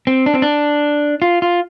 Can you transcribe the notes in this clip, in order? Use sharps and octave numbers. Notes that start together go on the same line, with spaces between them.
C4
D4
C4
D4
F4
F4